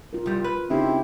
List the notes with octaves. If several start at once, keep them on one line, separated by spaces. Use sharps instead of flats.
F4 A#4
C2 G3
B4
C#3 G#3 C4 D#4 E4 G4